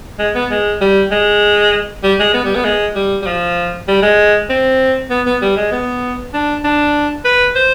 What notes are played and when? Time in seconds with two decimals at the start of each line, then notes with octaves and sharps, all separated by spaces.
0.19 G#3
0.35 B3
0.51 G#3
0.81 G3
1.11 G#3
2.03 G3
2.20 G#3
2.34 B3
2.45 G3
2.55 B3
2.65 G#3
2.95 G3
3.22 G3
3.27 F3
3.88 G3
4.02 G#3
4.49 C4
5.10 B3
5.26 B3
5.42 G3
5.57 G#3
5.72 B3
6.34 D4
6.64 D4
7.25 B4
7.56 C5